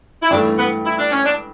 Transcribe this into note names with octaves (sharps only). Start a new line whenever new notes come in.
E4
G2 E3 A3 D4
B3
E4
D4
C#4
D4